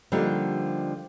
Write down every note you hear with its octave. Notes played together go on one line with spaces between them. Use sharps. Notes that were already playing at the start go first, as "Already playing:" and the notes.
D3 F3 G3 A#3 D#4 G4